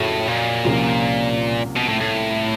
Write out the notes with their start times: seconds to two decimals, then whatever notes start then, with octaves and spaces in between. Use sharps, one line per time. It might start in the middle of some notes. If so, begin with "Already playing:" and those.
Already playing: F2 A2 C#3 F#3
0.28 A#2
0.65 C2 C3 F3 A#3 C#4
1.76 B2
1.89 A2
2.00 A2